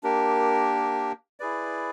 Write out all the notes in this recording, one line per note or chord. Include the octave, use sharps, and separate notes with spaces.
A#3 D4 G4 A#4
E4 G#4 B4 D5